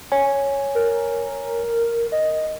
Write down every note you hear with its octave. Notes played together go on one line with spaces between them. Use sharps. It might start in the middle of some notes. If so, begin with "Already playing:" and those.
C#5 G#5
A#4
D#5